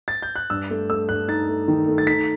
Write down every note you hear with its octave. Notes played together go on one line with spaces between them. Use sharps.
A6
G6
F#6
G2 E6
A3
A3 E6
G2 F#6
D#4 A6
A3
D#3
A3
A6
D#4 B6